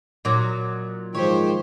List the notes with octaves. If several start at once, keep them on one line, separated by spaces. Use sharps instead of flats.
A#2 F#3 D#4 D6
G#2 D#3 F3 G4 C5 C#5